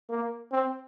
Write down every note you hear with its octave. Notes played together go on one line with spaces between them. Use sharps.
A#3
C4